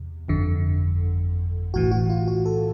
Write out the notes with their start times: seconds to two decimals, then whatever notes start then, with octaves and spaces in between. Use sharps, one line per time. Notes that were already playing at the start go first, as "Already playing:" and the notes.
Already playing: E2 C3
0.28 G1 F2 D3
1.74 B1 A2 E3 F#4
1.91 F#4
2.10 F4
2.28 F#4
2.46 A4